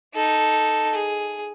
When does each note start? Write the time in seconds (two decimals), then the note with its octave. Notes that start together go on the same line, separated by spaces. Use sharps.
0.15 D#4 A4
0.94 G#4